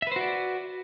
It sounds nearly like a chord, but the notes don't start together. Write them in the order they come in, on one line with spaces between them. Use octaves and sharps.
E5 B4 C5 F#4 D5